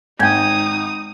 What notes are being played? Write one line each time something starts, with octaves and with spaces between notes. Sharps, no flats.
G#1 G#3 D#4 G5 D#6 G6 G#6